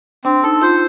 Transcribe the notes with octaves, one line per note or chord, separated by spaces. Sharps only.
C4 D4
D#4 A4
F4 C5